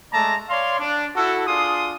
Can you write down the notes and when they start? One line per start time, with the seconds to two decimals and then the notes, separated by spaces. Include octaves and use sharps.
0.13 G#3 A3 D5 A5 A#5
0.49 C#5 D5 F5 C6
0.79 D4
1.16 E4 F#4 A4
1.47 D4 F4 G#4 C6 D#6